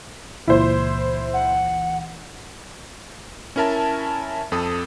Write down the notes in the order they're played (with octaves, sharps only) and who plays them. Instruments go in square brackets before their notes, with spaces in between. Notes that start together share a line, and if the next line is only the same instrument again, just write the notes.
[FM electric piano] C#2 A#2 E3 [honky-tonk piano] E4 C5
[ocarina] F#5
[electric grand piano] C#4 E4 A#4 E5 A5
F2 A4 D#6